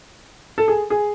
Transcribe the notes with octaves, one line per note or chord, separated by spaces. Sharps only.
A4
G#4
G#4